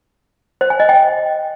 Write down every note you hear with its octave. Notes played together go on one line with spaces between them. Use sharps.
C5
G#5
D#5
G5